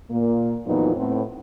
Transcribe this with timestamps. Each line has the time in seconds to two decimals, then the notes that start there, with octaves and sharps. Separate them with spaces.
0.11 A#2 A#3
0.67 F2 A#2 E3 F#3 B3 D#4
0.96 A2 B3 C4